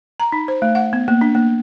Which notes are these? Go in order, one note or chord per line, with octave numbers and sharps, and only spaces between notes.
A#5
D#4
C5
A3
F#5
B3
A#3
D4
A#3